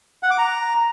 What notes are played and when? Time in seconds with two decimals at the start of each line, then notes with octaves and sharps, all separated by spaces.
0.23 F#5
0.31 D6
0.38 A#5